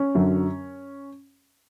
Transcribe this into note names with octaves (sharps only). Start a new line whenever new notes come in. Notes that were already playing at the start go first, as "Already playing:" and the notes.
Already playing: C#4
F#2 D3 F#3